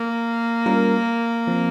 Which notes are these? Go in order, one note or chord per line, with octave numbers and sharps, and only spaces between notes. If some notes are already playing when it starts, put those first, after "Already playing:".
Already playing: A#3
G3 C#4 F4 A#4
F3 C4